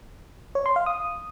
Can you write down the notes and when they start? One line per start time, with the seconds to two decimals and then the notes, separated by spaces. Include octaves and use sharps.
0.55 C#5
0.66 C6
0.76 F5
0.86 D#6